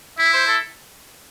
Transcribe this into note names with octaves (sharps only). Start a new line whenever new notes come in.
E4 E5
C5
A4